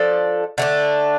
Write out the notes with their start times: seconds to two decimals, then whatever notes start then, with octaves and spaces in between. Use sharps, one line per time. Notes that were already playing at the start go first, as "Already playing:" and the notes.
Already playing: F3 D4 A4 D5
0.58 D3 A3 D4